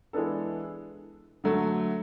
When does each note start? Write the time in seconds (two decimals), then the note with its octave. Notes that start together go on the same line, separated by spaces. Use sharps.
0.13 E3 G#3 B3 D4 A4
1.44 D3 F#3 A3